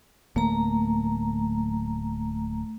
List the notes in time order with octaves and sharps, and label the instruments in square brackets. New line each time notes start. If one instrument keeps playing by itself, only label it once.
[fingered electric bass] D1 A#3 [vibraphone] A3 A#5